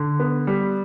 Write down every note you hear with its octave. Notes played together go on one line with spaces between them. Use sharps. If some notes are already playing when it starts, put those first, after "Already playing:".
Already playing: D3
B3
G3